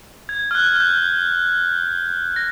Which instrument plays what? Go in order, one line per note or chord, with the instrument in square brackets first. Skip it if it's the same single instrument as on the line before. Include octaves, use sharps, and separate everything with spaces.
[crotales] G#6
F6
F#6
F#6
G6
A#6